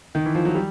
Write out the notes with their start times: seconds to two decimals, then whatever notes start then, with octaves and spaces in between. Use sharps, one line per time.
0.15 D#3
0.26 E3
0.35 F3
0.45 F#3
0.55 G3